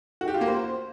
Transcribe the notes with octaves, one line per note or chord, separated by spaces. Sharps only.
F#4
G4
F4
A#3
C5